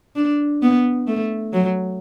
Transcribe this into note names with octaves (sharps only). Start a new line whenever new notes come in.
D4
B3
A3
F#3